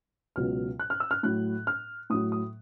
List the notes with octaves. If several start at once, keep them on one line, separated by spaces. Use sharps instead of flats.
C#2 B2 F#3 F6
F#6
F6
E6
F6
A2 F#3 F#6
F6
A2 F#3 D#6
D#6